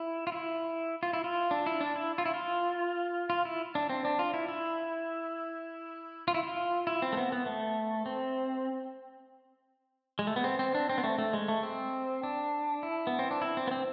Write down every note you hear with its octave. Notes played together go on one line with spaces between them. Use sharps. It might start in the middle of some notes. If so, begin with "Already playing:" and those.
Already playing: E4
F4
E4
F4
E4
F4
D4
E4
D4
E4
F4
E4
F4
F4
E4
D4
C4
D4
F4
E4
E4
F4
E4
F4
E4
C4
A3
B3
B3
A3
C4
G#3
A3
B3
C4
C4
D4
C4
B3
A3
A3
G#3
A3
C4
D4
E4
B3
C4
D4
E4
C4
B3
C4